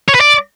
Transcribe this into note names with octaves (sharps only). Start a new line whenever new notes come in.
C#5
B4
D5